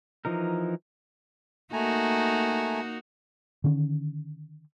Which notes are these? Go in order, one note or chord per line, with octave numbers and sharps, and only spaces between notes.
E3 F3 D#4 A#4
A3 A#3 D#4 F#4 G#5 A#5
D3 D#3 C#4